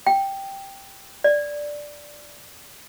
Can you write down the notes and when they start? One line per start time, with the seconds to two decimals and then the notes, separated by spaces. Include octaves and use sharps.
0.07 G5
1.24 D5